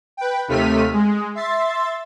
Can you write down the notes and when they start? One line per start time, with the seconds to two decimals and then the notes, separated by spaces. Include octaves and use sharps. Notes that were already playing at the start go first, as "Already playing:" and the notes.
0.17 B4 G5
0.48 D#2 C3 A3 F6 B6 D#7
0.93 G#3
1.35 E5 C6 A6